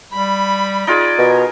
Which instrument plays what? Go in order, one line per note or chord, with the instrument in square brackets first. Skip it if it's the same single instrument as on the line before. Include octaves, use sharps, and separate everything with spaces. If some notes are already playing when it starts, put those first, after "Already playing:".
[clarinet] G3 [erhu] B5
[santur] D#4 F4 G#4 [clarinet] D5
[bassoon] B2 [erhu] A#4